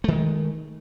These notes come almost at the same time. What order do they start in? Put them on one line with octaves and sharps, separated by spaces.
A3 D#3 G#3